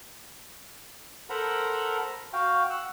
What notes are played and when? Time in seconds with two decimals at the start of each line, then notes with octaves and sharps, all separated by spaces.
1.30 A4 A#4 C5 F#5 A#5 B5
2.33 F#4 F5 G5
2.70 F#5 E6